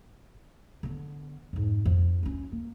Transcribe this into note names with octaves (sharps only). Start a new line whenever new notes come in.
D3 B3
F2 G#2
F2
C#4 F4
A#3